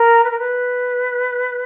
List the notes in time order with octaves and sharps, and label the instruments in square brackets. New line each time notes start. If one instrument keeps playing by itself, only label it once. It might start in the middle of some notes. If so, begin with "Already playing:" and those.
Already playing: [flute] A#4
B4
A#4
B4